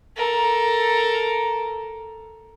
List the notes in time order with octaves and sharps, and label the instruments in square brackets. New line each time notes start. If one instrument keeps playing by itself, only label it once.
[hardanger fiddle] A4 A#4